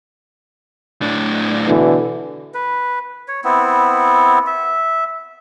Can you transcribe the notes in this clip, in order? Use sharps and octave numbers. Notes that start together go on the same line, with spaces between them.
A2 D4
B2 D3 E3
B4
C#5
B3 C4 E4
E5